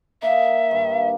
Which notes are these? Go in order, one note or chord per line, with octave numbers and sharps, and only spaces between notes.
A#3 D#4 E5
G2 D#3 G4
F5